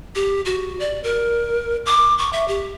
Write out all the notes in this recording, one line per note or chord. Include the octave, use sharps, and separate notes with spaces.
G4
F#4
D5
A#4
D6
C#6
E5
G4